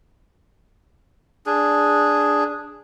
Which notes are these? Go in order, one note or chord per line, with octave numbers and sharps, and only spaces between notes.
D4 G#4